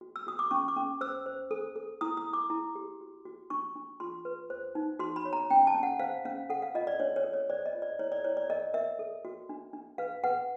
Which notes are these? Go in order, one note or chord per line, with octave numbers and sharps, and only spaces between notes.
F#4
E6
F#4 D#6
D6
C#4 C#6
D6
C#4
C5 E6
C5
A4
A4
E4 D#6
D#6
E4
D6
E4
G4
F#4
F#4
D4 C#6
D4
F4 C6
B4
C5
D#4
F#4 C6
B5
C#5
A#5
C#4 G5
A5
C#4
F#5
C5 F5
C#4 F5
A4 F#5
F5
F4 D#5
D5
D4 C#5
C#5
A4
C#5
C5 D5
D#5
F4
D5
E4 C#5
D5
E4 C#5
D5
A#4 D#5
A#4 E5
A4
F#4
D4
D4
B4 F5
B4 F#5